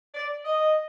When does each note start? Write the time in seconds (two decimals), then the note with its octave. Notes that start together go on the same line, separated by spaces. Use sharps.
0.15 D5
0.45 D#5